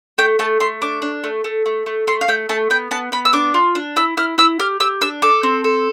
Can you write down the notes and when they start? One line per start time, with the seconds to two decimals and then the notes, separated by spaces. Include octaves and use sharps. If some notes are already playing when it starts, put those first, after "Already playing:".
0.18 A3 G5
0.39 A3 A5
0.60 A3 C6
0.82 D4 D6
1.02 D4
1.24 A3
1.44 A3
1.66 A3
1.86 A3
2.07 A3 C6
2.21 F5
2.28 A3 G5
2.49 A3 A5
2.70 B3 G5
2.91 B3 A5
3.12 B3 B5
3.25 E6
3.33 D4 D6
3.54 F4
3.75 D4
3.96 E4 E6
4.17 E4 F6
4.38 E4 E6
4.59 G4 F6
4.80 G4 E6
5.01 D4 E6
5.22 A4 D6
5.43 C4
5.64 A4